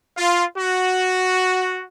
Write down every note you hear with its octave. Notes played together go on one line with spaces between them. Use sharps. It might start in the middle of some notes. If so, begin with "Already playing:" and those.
F4
F#4